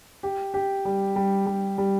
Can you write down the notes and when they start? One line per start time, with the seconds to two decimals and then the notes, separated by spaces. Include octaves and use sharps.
0.23 G4
0.54 G4
0.85 G3
1.16 G3
1.46 G3
1.78 G3